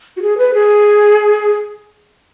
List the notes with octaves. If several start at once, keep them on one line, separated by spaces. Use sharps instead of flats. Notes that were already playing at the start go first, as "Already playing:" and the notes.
F#4
G#4
B4
G#4